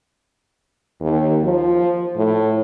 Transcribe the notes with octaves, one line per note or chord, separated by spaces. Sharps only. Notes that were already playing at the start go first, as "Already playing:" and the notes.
D#2
F3
A2